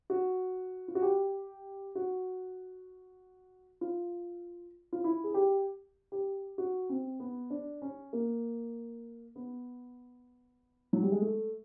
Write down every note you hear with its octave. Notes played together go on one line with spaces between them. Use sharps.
F#4
F4
F#4
G4
F#4
F4
F4
E4
G#4
G4
G4
F#4
C4
B3
D4
C#4
A#3
B3
F#3
G3
G#3
A3